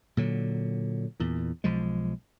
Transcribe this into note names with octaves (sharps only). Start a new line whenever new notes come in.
A#2 D3 F#3
E2 A#2
B1 F3 G#3